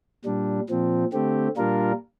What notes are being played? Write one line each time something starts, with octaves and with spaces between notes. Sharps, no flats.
A#2 G3 D4
A#2 F3 C4
D3 A3 C4 G4
A#2 G3 D4 F4 A#4